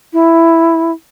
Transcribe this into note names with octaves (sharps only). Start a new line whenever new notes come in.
E4